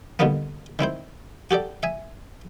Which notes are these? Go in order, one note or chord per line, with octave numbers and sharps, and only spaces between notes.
B2 D3 D#3 G3 A#3 B3
D#3 C4 E4 C5
F#4 G4 A4 D5
E5 G#5